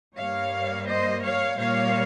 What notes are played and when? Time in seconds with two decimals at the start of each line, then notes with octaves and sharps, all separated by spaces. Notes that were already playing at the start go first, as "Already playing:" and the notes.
0.16 G2 G3 A#3 C#5 F5
0.87 C5 D#5
1.22 C#5 F5
1.58 A#2 G3 A#3 C#5 F5